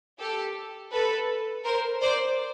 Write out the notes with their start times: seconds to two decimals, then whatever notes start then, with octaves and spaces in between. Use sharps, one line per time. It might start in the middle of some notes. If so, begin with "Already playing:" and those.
0.19 G4 A4
0.92 A4 B4
1.64 A#4 C5
2.01 C5 D5